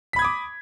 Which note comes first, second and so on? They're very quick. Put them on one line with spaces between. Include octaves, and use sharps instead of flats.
B6 B5 G#6 D#6 D6